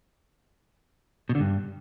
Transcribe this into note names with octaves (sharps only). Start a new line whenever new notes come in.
B2
D3
G2